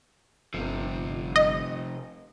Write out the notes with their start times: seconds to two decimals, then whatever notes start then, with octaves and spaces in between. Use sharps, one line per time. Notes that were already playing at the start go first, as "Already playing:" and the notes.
0.54 G1 C3 F3
1.36 D#5